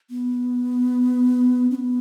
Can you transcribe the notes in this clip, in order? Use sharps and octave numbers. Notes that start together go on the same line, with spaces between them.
B3
C#4
B3